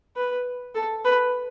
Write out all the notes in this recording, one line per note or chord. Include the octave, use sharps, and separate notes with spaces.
B4
A4
B4